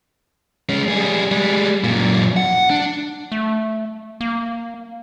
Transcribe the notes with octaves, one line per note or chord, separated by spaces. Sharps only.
G#3 C#4
G3 G#4
G3 G#3
F#2 A#2
F#5
D4
A3
A#3